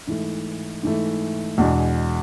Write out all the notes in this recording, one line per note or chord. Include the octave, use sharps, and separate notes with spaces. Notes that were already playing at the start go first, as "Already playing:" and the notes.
G#2 E3 A3
G#2 E3 A3
E2 B2 G#3 D4